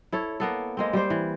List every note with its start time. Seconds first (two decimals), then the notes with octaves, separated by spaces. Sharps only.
0.12 E4 A4 C#5
0.40 A#3 B3 A4
0.77 G#3 A#3 C4
0.93 G3 G4 C5
1.10 E3